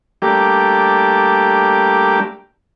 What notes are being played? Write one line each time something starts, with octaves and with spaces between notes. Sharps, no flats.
G3 A3 A#3 D4 G4